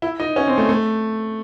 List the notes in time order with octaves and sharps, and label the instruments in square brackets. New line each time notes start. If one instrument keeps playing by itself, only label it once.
[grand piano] E4
D#4
C#4
C4
A3
A3